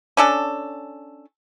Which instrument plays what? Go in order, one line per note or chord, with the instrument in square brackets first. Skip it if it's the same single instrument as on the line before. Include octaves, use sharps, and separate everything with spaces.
[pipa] C#4 D4 A4